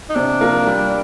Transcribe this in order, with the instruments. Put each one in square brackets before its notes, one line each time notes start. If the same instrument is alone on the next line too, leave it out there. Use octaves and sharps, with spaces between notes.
[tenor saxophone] D#4
[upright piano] C3 [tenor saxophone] D4
[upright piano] F3 A#3 F4
G3